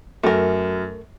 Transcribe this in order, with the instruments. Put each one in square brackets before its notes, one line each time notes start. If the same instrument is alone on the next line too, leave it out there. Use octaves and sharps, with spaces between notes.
[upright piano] F#2 [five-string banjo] A3 A#4